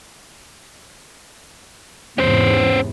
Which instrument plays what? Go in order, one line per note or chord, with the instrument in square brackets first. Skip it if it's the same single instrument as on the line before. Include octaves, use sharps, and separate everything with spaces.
[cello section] E2 G#2 C3 [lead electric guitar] C#4 C5